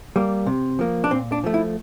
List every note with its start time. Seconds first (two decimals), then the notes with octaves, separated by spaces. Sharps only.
0.16 G3 A#3
0.47 C3
0.79 F3 A#3
1.04 D4
1.11 A#2 C4
1.32 D4
1.44 F3 A3
1.54 E4